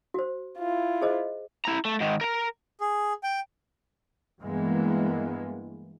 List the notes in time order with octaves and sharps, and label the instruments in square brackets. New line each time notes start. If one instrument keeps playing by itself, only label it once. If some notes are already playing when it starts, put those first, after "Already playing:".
[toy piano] F#4 C5
[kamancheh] E4 F4
[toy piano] G#4 C5 D#5
[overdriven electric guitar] E4 A#5
A3
G#2 D#3
A#4 A#5
[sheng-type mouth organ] G#4
G5
[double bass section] G2 E3 G#3 A#3 B3